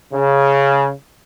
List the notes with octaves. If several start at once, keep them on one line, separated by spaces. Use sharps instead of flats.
C#3